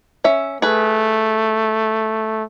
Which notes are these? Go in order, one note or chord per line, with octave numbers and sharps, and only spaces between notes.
C#4 E5
A3 G#4 B4